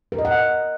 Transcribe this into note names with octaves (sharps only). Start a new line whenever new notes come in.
A#4
D#5
F#5